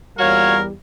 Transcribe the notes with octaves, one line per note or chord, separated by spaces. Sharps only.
E2 A#2 G3 F#4 A#4 C#5 F5